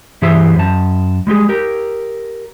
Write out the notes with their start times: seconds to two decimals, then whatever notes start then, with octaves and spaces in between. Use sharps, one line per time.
0.22 G2 E3 G4 G#4 C5 E5
0.56 F#2 A5
1.27 G3 G#3 G4 G#4
1.49 G4 A#4